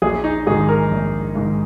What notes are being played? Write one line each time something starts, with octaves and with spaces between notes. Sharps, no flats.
A#1 G#4
D#4
G#2 D#3 G#4
A#4
A#1
G#2 D#3